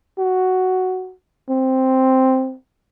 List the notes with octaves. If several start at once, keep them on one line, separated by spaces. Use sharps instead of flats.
F#4
C4